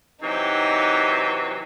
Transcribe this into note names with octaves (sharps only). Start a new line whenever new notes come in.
C3 E3 F#3 D#4 G5